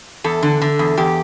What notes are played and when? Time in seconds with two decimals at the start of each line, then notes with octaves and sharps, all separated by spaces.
0.24 E2 A4
0.43 D3
0.61 D3
0.79 E2
0.97 E2 G4